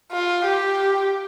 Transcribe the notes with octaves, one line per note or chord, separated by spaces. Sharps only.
F4
G4